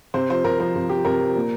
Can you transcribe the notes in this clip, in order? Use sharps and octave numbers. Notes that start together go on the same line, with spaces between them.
C3 C5
F3 C5
C3 A#4
F3 A#4
C3
F3 G4
C3 A#4
F3
A#2